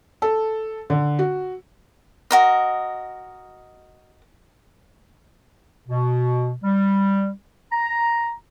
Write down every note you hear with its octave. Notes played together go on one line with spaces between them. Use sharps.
A4
D3
F#4
F#4 A#4 D#5
B2
G3
A#5